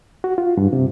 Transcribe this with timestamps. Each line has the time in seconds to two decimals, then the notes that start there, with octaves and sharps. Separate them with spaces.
0.24 F#4
0.38 F4
0.57 G2
0.73 C3